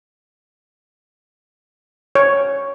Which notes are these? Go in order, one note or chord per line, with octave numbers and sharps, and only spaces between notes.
C#5